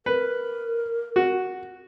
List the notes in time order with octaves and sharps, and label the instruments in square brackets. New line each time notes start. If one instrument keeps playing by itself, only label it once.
[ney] A#4 [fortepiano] B4
[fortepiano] F#4